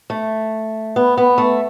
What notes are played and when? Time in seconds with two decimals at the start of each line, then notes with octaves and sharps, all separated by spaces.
0.10 A3
0.96 B3
1.17 B3
1.38 A3